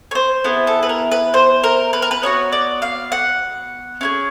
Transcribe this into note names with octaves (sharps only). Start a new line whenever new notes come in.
C#5
C5
B3 E4 G#4
A4
B4
A#4
B4
C5
A#4
B4
A#4
B4
B3 D#4 F#4 C#5
D5
F5
F#5
C#4 E4 G#4